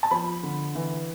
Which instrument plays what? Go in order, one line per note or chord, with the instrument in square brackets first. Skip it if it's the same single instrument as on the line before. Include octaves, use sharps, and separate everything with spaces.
[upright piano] A5
F3 B5
D3
E3